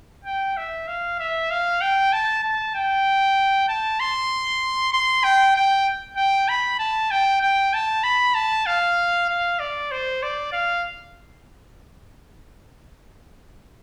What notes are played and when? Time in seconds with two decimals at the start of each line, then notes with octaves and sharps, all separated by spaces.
0.25 G5
0.57 E5
0.87 F5
1.19 E5
1.51 F5
1.81 G5
2.12 A5
2.44 A5
2.75 G5
3.68 A5
4.00 C6
4.92 C6
5.24 G5
5.55 G5
6.17 G5
6.49 B5
6.79 A5
7.11 G5
7.42 G5
7.73 A5
8.04 B5
8.35 A5
8.66 F5
9.29 F5
9.59 D5
9.91 C5
10.22 D5
10.53 F5